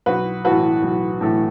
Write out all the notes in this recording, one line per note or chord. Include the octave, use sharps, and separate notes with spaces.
B1 F#4 B4
A2 E3 A3 F#4 B4
B1
A2 E3 A3